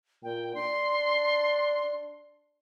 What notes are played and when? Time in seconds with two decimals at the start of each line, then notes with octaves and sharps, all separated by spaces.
0.23 A#2 G5
0.55 D4 C6